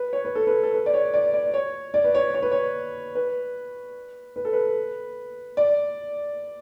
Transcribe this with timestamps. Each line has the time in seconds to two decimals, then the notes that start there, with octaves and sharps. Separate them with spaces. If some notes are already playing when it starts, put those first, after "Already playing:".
Already playing: B4
0.13 C#5
0.25 B4
0.35 A4
0.47 B4
0.63 A4
0.74 B4
0.86 D5
0.94 C#5
1.14 D5
1.34 D5
1.54 C#5
1.94 D5
2.04 B4
2.15 C#5
2.34 C#5
2.42 B4
2.51 C#5
3.15 B4
4.36 B4
4.45 A4
4.53 B4
5.57 D5